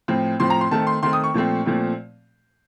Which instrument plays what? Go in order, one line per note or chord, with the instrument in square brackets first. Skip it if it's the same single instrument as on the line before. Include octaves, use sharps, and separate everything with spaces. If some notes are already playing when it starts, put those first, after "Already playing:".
[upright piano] A2 F3 C4
A2 F3 C4 C6
A#5
C6
D#3 A3 C4 A5
C6
D#3 A3 C4 C6
D#6
C#6
A#2 F3 A3 C4
A#2 F3 A3 C4